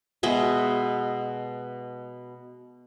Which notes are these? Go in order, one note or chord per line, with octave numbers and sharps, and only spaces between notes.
B2 G#3 E5